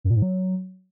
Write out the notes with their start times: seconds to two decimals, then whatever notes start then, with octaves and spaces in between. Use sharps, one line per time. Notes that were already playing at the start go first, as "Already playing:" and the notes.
0.04 F#2
0.10 A#2
0.16 G#2
0.22 F#3